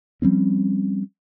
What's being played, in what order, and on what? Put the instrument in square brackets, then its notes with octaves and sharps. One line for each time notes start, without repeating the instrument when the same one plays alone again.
[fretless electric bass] F3 G3 C4 C#4